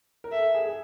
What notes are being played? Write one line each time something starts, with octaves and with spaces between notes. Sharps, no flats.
A#4
A4 E5
G#4
G#4